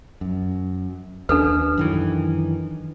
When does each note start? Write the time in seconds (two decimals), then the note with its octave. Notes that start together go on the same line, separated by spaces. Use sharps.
0.21 F#2
1.29 D#2 D4 A4 B4
1.77 F#2 D#3 E3